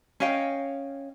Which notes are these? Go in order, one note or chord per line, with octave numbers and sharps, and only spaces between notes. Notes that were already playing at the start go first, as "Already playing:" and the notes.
C#4 D#5 F5 G5